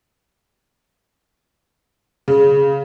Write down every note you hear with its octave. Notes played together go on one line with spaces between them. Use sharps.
C#3